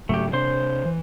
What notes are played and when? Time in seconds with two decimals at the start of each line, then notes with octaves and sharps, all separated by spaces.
0.09 G#2 C#3 F#3 A3 G4
0.33 C3 D4 C5 C6
0.85 E3